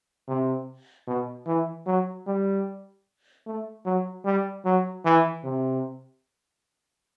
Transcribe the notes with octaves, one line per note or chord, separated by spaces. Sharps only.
C3
B2
E3
F#3
G3
A3
F#3
G3
F#3
E3
C3